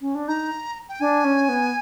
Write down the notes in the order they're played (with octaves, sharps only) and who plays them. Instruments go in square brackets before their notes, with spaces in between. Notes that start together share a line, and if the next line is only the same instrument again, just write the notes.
[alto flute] C#4
D4
[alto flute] D#4 [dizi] A#5
[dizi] G5
[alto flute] D4 [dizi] G#5
[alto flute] C#4
B3